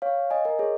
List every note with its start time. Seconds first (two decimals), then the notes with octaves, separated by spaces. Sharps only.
0.02 C#5 F5
0.30 D#5 G#5
0.45 A#4 D#5
0.59 G#4 C#5